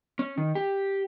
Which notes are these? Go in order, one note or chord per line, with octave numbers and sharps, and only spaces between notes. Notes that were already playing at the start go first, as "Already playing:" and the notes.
C#4
D#3
G4